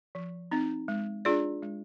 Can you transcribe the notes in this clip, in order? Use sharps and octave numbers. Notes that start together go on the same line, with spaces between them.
F3
C4 D#4
G#3
D4 F4 G#4 D5
G#3